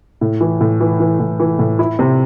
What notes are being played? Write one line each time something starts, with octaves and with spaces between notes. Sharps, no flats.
A2
E3
A2
E3
E3
A2
E3
A2
E4
C3